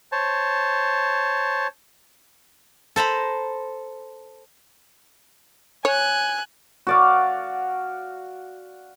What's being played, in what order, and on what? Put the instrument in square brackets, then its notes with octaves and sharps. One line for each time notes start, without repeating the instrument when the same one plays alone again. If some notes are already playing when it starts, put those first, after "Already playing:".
[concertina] C5 C#5 A5
[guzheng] A4 C5 A#5 B5
[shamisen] C#5 [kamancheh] G#5 F#6
[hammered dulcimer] F#4 D5 F5